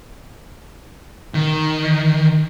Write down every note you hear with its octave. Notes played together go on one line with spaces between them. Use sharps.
D#3